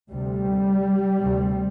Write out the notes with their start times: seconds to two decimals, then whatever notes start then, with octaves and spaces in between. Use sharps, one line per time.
0.11 D2 C3 G3
1.17 D2 C3